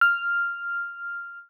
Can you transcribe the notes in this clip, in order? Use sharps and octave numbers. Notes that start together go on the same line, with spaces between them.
F6